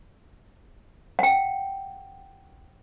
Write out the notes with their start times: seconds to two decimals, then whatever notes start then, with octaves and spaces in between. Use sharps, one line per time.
1.19 F#5 G5